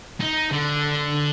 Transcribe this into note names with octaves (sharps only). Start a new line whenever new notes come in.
D#4
D3